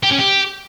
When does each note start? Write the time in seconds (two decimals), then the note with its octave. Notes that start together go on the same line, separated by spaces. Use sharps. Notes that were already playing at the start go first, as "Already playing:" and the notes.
0.03 G4
0.11 C#4
0.19 G4